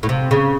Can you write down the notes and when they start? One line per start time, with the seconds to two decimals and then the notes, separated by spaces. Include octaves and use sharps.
0.03 A2
0.09 C3
0.31 C#3